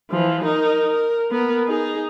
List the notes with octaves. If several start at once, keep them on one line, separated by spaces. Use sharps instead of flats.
E3 F3
D#4 A#4
A#4
B3 A#4
D#4 G#4